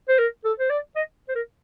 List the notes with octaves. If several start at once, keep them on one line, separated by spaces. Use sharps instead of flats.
C5
A#4
A4
C5
D5
D#5
C5
A#4